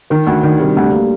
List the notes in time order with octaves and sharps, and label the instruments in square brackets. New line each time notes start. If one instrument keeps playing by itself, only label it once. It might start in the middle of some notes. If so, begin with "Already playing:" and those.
[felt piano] D#3 [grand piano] A#4
[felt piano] D2 [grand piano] F#4
[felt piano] D#3 [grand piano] D4
[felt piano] C3 [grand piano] G3
[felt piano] D2 [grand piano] A3
[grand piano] A#3